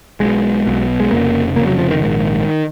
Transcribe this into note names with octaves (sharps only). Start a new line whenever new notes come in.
B1 B2 G#3
B1 B2
G#3
F1 F2 C#3 A#3
F1 F2 C#3 A#3
F#3
F3
D#3
A#1 G#2